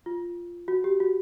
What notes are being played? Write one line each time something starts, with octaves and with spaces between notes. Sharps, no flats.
F4
F#4
G4
F#4